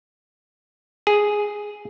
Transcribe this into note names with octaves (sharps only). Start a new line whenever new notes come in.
G#4